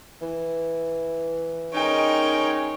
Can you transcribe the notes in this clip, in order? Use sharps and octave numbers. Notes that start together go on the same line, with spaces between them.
E3
G#3 C#4 D#4 A#4 C#5 G5